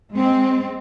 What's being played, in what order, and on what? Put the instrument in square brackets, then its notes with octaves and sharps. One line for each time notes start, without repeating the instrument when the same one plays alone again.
[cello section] G#3 C4